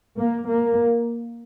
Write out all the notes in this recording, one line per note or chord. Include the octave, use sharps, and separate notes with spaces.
A#3
A#3